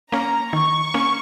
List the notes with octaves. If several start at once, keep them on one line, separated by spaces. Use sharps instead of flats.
A#3 C#4 A#5
D#3 C#6
A#3 C#4